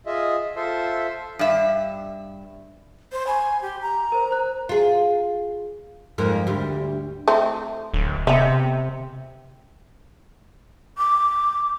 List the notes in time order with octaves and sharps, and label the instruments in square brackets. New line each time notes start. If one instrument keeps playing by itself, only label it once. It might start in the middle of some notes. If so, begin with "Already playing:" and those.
[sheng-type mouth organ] F4 G#4 D#5 E5
F4 A4 C5 E5 C6
[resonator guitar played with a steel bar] G2 E5
[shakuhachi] C5
[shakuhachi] G#5 [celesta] B5 C#6
[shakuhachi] G4
A#5
[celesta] A#4 C5
C5 F#6
[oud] F4 G#4
F2 G#2 A#3
D2 G3
[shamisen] A3 C4 E4
[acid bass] D1
[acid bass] C3 [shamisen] B3 E5
[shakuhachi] D6